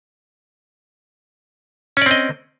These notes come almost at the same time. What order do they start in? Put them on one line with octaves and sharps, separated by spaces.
C#4 D5 C4 D#5